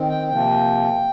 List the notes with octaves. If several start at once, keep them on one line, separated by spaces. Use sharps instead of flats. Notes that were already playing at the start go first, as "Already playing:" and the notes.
Already playing: D#3 C4
G5
C3 F3 A#3 G5